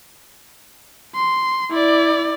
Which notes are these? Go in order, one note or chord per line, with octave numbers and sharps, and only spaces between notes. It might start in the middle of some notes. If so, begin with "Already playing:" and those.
C6
E4 D5